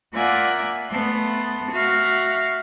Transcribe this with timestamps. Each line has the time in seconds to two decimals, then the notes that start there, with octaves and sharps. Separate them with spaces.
0.14 A#3 F4 D5 E5 F#5 G#5
0.90 A3 B3 A5 C6
1.70 F#4 E5 F5